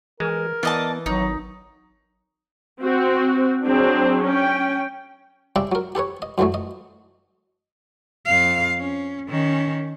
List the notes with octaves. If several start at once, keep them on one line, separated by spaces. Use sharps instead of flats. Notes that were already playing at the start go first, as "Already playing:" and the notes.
E3 G#3 A#4
E3 B3 D5 D#5 A5
G#1 F#3 D#4
C4 F#4
F#3 C4 D4 G#4
C#4 G5
C#3 G3 D4 E5 G5
F#3 A#4
G4 A4 B4 C#5
D#5
F#2 D3 E3 F#3 A3
D#5
F2 F5
C#4
D#3 C#4